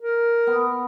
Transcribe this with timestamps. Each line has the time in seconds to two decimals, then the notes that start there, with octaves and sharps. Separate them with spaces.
0.01 A#4
0.47 B3